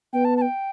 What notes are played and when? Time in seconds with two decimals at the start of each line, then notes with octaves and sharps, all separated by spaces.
0.13 B3 G5
0.25 A5
0.37 A5
0.42 G5